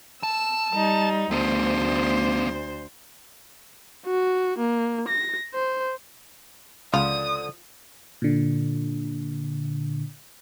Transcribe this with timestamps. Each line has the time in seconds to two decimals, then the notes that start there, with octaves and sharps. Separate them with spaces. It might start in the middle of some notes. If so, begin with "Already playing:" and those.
0.23 A5 E6
0.73 G3 D#4
1.31 D2 A3 B3 C5
4.06 F#4
4.59 A#3
5.08 A#6
5.54 C5
6.94 C#2 D3 F3 F4 D#6
8.22 A#2 D3